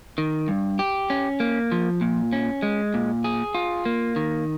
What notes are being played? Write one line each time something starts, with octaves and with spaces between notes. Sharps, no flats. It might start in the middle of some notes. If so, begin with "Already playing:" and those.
D#3
G2
G4
C#4
A#3
F3
A#2
C#4
G#3
A#2
G#4
F4
A#3
D#3